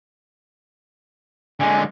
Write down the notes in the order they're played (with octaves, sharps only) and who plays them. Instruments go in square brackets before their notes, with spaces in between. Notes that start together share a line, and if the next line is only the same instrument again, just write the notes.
[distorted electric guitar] D3 G#3 [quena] G#5